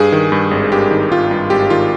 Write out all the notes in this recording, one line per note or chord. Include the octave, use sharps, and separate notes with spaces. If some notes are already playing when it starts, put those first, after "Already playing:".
Already playing: G2 G#4
D#3
G2
G#1
G2 G4
D#3
G#1 F4
G2
G#1 G4
D#3 F4